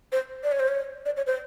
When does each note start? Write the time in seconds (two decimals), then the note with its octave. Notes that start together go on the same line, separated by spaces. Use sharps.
0.12 C5
0.44 D5
0.52 C#5
0.60 C5
0.68 C#5
1.06 D5
1.17 C#5
1.27 C5